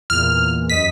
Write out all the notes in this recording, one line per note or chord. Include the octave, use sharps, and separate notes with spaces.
E2 A#2 F6
F#2 D#5 B6 D#7